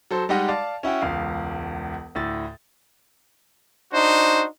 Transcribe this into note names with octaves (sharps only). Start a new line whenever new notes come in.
F#3 A4 C5
G3 G#3 D#4 G4 D#5 F#5
D5 F5 A5
C#4 E4 F#4 G5
E1 C#2 F5
D2 A2 A6
D4 D#4 F#4 C5